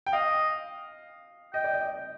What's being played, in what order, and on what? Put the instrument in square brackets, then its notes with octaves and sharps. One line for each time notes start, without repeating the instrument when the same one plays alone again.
[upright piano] G5
[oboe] D#5 [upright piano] F5
[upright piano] D#5 [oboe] G5
[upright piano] D5
D#5